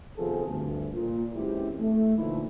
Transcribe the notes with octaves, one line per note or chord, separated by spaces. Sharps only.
C3 D#3 F3 B3 G#4 A4
D2 G2
A#2
F#2 E3 G#3 C4 E4 G4
A3
A#2 D3 E3 F3 D#4 E4